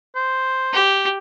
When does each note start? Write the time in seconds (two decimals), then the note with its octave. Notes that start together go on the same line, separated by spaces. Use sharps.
0.15 C5
0.73 G4